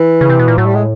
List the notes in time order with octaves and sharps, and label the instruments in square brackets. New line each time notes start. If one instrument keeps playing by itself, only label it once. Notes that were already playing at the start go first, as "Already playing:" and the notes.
Already playing: [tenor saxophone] E3
[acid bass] C#3
C3
B2
A#2
[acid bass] A2 [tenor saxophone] F#3
[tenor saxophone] G3
G#3